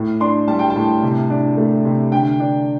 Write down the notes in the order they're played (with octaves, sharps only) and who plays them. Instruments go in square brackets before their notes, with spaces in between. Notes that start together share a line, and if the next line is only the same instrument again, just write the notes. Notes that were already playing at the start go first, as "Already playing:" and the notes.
Already playing: [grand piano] A2
D4 C6
G3 A5
G5
A5
A2
C3
D4
A3
C3
D3 G5
D4